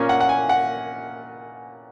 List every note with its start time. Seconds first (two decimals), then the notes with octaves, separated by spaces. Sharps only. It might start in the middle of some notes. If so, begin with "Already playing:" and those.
Already playing: A#2 A#3 C#4
0.09 F#5
0.20 F#5
0.29 G#5
0.49 F#5